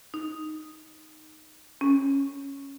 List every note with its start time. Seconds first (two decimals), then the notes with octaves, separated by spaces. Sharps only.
0.14 D#4
1.81 C#4